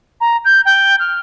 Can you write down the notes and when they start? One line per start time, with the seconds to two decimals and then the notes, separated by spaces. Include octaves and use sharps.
0.21 A#5
0.45 G6
0.65 G5
0.99 F6